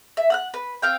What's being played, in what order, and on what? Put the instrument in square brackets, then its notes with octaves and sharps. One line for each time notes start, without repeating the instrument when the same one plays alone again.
[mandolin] E5
F#5 E6 F#6
B4
C4 F5 G5